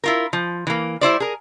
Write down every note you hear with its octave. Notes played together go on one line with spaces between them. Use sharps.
E4 F4 A#4
F3
E3 A#3
G3 E4 C5 D5
G#4 A#4